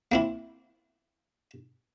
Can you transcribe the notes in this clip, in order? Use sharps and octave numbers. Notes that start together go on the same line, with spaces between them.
A#3 C4 E4